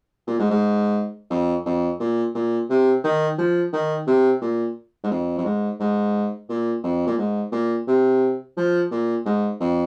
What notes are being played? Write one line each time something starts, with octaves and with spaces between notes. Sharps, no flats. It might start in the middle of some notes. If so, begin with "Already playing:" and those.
A#2
G#2
G#2
F2
F2
A#2
A#2
C3
D#3
F3
D#3
C3
A#2
G#2
F2
F2
G#2
G#2
A#2
F2
A#2
G#2
A#2
C3
F3
A#2
G#2
F2